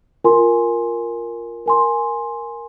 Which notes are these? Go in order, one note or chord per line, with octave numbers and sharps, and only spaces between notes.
F4 A#4 G#5 C6
A#4 G#5 C6